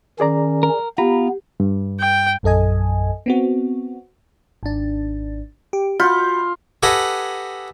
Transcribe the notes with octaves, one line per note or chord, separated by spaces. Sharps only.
D#3 C#4 G#4 D5 A#5
A#4
B3 F4 G4 A#5 B5
G2
G5
A#1 F#2 A4 D#5 G#5
B3 C4 F#4
G#1 D4
G4
F4 F#4 B5 G6
G4 A4 B4 D#5 F#5 G#5